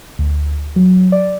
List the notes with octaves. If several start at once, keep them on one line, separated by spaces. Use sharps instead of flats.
D2
F#3
D5